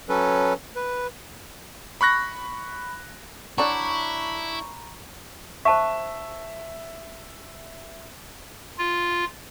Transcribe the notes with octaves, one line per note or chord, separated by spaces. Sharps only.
F#3 C#4 A4 B4
B4
B5 C#6 F#6 A#6
F#3 D4 E4 A#5 B5 C#6 G6
C5 E5 A5 C#6
F4